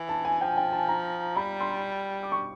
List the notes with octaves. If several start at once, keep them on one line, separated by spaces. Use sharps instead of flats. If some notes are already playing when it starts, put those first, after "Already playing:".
Already playing: E3
A5
G#5
F3 G5
G5
A5
A#5
G3 B5
C6
D6
C#6